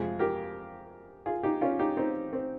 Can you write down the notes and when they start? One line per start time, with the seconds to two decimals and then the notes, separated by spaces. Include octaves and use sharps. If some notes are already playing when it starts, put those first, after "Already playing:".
Already playing: F2 C3 F3 G#3 G#4
0.19 G4 A#4
1.26 F4 G#4
1.43 D#4 G4
1.61 C#4 F4
1.79 D#4 G4
1.97 C4 D#4
2.33 C4